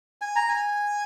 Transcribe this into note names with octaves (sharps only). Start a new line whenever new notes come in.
G#5
A#5
G#5